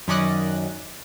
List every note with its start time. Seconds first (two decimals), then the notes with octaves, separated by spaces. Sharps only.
0.08 F#2 D#3 C#4 D5 D#5 F#6